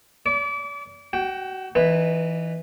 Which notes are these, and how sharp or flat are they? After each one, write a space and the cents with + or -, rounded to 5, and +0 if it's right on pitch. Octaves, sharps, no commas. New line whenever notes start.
D5 -45 D6 -30
F#4 +30 G5 +0
E3 +0 D#4 -25 B4 +0